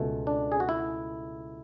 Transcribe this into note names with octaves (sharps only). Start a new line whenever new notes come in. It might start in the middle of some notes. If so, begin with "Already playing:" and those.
Already playing: C#2 B2 A3
D4
G#4
F#4
E4